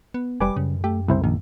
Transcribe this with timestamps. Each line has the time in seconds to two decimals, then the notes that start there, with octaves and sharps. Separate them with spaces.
0.14 B3
0.40 F1 G3 B4 G#5 D6
0.57 F#2 C#3
0.84 A3 G4
1.08 C2 C#3 E4 C5
1.24 A#1 D#3